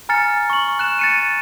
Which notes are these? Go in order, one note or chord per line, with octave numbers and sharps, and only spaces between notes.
G#5 A#5 F6 A6 C#7
C#6 F#7
F#6 E7
A6 C#7 D#7